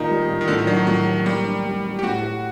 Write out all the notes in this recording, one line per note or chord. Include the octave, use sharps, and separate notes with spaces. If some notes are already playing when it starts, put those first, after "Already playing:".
Already playing: A#2 D#3 D#4
G3
A#2
D#3
A2 D3
D#3
F#3 D4
D#3
A2 F#3
G4
G3 A#3
D4
G3
G3
G4
A2 F#4
G4